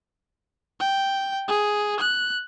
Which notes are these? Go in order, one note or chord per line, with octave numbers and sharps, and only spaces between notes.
G5
G#4
F#6